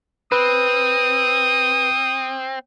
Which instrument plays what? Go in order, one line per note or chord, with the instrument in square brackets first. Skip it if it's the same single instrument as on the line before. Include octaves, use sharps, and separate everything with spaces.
[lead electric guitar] C4 [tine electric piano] B4 [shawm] D#6